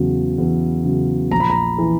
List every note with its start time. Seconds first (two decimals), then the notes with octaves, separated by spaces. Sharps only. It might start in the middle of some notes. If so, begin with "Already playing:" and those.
Already playing: E2 C#3 F#3
0.38 E2
0.84 C#3 F#3
1.31 A#1 A#5
1.40 B5
1.50 A#5
1.78 E3